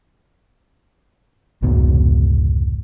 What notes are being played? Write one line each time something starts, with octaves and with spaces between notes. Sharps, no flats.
F1 C#2 G#2 B2